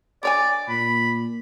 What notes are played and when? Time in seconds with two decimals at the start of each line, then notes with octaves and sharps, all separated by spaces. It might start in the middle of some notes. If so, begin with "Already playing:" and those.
0.23 D3 C#5 D5 G#5
0.68 A#2 B5